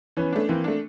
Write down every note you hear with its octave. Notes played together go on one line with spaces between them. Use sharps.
E3 B3 C#4
A3 D4
E3 A#3 C4
A3 D4